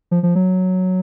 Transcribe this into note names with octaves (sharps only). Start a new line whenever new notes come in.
F3
F3
F#3